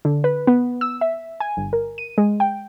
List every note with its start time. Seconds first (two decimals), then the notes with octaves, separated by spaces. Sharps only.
0.05 D3
0.24 B4
0.47 B3
0.81 E6
1.01 E5
1.40 G#5
1.57 G1
1.73 A#4
1.98 D#7
2.18 G#3
2.40 G5